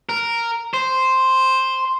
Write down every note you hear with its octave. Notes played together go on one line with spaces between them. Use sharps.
A#4
C5